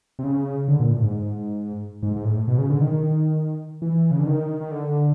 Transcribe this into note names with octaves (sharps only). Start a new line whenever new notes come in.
C3
C#3
D3
A#2
A2
G#2
G#2
G#2
A2
B2
C#3
D3
D#3
D#3
E3
C#3
D3
D#3
D#3
D3